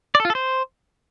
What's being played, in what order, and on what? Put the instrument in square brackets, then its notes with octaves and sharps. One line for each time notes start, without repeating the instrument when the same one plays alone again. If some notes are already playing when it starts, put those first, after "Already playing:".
[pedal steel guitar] D5
A4
F4
A4
C5